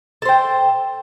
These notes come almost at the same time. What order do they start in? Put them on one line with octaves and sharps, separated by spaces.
A4 C5 G5